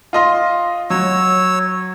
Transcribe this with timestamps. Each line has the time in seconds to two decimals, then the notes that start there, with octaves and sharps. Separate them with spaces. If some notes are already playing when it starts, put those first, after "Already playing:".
0.13 F4 D#5 C6
0.90 F#3 C#5 E6